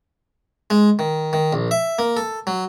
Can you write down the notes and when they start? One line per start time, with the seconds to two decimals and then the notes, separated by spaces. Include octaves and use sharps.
0.70 G#3
0.99 D#3
1.33 D#3
1.53 A#1
1.71 E5
1.99 A#3
2.17 A4
2.47 F#3